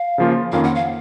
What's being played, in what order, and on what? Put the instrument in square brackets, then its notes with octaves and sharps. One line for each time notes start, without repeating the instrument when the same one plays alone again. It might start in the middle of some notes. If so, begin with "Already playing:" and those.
Already playing: [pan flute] F5
[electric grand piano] C#3 F3 A#3 F4
[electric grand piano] F2 D#3 A#3 C#4 F4 [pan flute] F5
[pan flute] F#5
F5